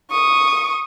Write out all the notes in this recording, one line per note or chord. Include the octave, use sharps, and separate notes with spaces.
C#6 D#6